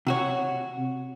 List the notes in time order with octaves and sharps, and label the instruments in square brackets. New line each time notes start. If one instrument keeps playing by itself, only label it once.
[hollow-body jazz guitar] C3 F#4 C#5